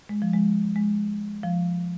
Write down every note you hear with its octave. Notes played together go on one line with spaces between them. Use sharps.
G#3
F3
G#3
G#3
F3